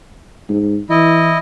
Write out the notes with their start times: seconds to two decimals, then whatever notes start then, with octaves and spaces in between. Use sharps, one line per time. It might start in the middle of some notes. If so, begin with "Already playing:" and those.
0.49 G#2
0.90 E3 E4 D#5